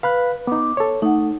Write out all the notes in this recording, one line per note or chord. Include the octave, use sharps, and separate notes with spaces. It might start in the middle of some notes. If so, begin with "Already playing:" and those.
B4 F5 B5 F#6
B3 D#4 D6
A4 C#5
A3 D#4 F#5